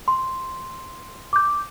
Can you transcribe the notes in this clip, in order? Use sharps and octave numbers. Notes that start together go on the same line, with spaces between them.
C6
D6 G6